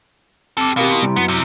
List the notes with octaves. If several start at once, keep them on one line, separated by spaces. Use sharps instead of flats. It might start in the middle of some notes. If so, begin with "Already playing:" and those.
C4 G4 A4 D6
B2 G4 A#4 F5
E4 A#5 C6
C3 G3
F#2 B3
C2 C3